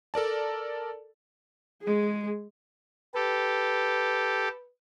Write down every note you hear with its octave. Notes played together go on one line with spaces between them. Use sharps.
A4 A#4 D5 A5
G#3 G#4
G4 A4 B4